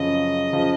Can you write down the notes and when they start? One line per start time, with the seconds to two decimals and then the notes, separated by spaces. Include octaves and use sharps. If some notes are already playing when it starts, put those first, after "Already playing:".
Already playing: F#2 C#3 F3 D#5
0.53 C#3 F3